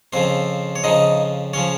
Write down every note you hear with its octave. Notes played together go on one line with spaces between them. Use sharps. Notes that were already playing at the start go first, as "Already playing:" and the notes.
F2 C#3 F3 C4 C5
C#5
F2 C#3 F3 D#4 D#5
C#3 F3 C#4 C#5